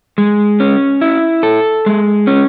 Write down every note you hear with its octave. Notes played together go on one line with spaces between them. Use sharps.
G#3
C#4
E4
A4
G#3
C#4